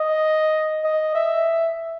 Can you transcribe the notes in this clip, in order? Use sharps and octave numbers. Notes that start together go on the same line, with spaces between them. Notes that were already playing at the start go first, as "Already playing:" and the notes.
Already playing: D#5
D#5
E5